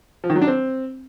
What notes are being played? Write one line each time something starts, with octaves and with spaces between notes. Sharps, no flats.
F3
D#3
F#3
D4
C4